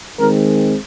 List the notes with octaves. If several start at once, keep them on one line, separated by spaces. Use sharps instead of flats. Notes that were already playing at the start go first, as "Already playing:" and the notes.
D#3 G#3 C4 A#4